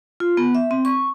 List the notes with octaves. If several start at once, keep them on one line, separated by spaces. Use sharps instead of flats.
F4
B3
E5
C4
C#6